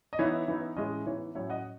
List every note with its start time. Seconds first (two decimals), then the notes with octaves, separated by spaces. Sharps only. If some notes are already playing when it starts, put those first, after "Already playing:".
0.13 D#5
0.19 E3 B3 D#4 C#5 E5
0.48 E3 B3 D#4
0.76 A2 E3 G#3 C#4 D#5
1.06 E3 B3 D#4 C#5
1.35 A2 F#3 C#4 C#5 E5
1.50 D#5 F#5